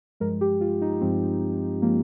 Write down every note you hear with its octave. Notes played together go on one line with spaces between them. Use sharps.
G2 F3 G#3 A#4
G4
F4
D#4
G2 F3 G#3 C4
F3 G#3 A#3